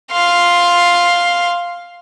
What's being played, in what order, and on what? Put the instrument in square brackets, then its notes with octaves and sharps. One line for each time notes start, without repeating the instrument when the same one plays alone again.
[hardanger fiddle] F5 C6